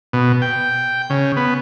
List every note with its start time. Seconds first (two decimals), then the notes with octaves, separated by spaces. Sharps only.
0.13 B2
0.42 G5
1.10 C#3
1.37 B3